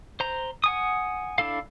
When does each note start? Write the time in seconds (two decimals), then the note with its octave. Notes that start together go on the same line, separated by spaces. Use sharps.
0.20 C5 A#5
0.64 F#5 G#5 D#6
1.38 D4 E4 A4 F5